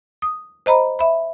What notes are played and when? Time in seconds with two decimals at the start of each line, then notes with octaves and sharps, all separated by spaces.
0.22 D#6
0.66 C5 D#5 A#5 B5
0.99 E5 B5